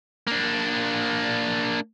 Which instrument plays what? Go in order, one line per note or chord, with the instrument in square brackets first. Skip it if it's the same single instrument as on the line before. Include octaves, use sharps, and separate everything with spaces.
[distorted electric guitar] A#3 D4